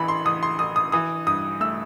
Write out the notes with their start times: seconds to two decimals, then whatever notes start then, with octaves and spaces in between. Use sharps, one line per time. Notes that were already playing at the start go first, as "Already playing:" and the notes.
Already playing: A1 E3 B5
0.08 C6
0.25 A1 D#6
0.43 C6
0.59 A1 D#6
0.76 D#6
0.92 E3 D#6
1.27 G2 D#6
1.60 A3 E6